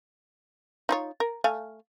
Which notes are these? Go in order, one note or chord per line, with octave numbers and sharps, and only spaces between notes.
D#4 F4 C#5
A#4
A3 F5 G#5